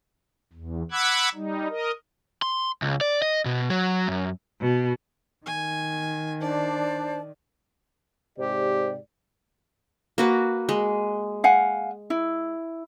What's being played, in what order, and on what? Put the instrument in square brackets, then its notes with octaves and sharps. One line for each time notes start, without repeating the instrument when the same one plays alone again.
[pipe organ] E2
F#5 B5 D6 E6 F#6 G#6
G3 D#4
A#4 D#5
[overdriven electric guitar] C6
C#2
D5
D#5
B2
F#3
F#2
[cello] B2
[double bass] D#3 [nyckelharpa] G#5
[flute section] D4 C5 A5 [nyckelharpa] D5
[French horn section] G#2 D5 [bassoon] C3 [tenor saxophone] G4
[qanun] A#3 F#4 B4
G#3
[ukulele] F5 F#5 G#5
E4